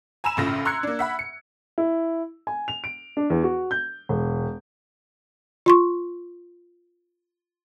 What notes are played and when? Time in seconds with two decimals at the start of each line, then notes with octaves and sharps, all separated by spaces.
0.24 G#5 A#5 B5 E6 E7
0.37 A#1 A2 C#3 F4 A#6
0.65 A#5 C6 E6 F#6 G#6 C#7
0.83 A#3 D4
0.99 E5 F#5 B5
1.19 C#7
1.78 E4
2.47 G#5
2.68 F7
2.84 D7
3.17 D4
3.30 E2
3.44 F#4
3.71 G6
4.09 E1
5.66 F4 C6 C#6